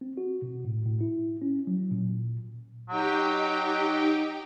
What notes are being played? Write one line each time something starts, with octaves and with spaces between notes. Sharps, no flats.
C4
F#4
B2
A2
A2
E4
C#4
F#3
A#2
F#3 D#4 G4 G5